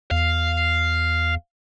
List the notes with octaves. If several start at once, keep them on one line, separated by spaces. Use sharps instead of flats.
E2 F5